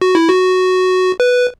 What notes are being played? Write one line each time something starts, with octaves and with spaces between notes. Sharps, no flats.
F#4
E4
F#4
B4